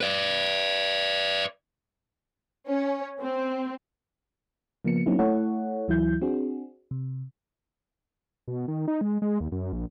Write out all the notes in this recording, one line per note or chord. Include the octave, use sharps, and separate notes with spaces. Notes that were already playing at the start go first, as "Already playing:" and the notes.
B4 D5
C#4
C4
C#3 F3 A#3 B3 C#7
F#3 A#3 C4 C#4 D#4 E4
A3 E4 A4 C#5 F#5
C#2 E3 F#3 E4 G6
C4 D4 F#4 G#4
C3
B2
D#3
D#4
G#3
G#3
D#2
F#2
A#1